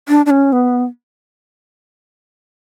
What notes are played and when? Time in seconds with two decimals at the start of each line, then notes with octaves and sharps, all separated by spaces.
0.08 D4
0.26 D4
0.30 C#4
0.53 B3